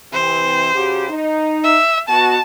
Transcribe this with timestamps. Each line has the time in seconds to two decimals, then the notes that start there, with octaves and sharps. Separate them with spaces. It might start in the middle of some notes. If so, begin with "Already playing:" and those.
0.13 C3 E3 C5
0.75 C#3 F#4 G4
1.10 D#4
1.64 E5
2.09 B2 B3 F#4 A5